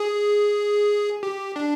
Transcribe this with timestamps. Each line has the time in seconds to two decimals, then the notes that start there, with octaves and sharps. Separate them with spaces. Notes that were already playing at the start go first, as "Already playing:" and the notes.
Already playing: G#4
1.23 G4
1.56 D4